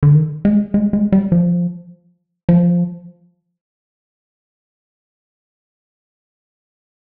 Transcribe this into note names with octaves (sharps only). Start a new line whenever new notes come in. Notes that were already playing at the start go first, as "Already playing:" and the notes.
D3
D#3
G#3
G#3
G#3
G3
F3
F3